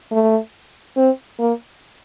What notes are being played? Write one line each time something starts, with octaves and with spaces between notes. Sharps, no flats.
A3
C4
A#3